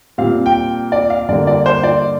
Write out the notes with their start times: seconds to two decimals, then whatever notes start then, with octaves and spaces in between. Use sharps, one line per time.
0.18 A#2 G3 C4 F5
0.46 G5
0.92 D5
1.10 F5
1.28 G2 D3 A#3 D5
1.47 D5
1.66 C5
1.83 D5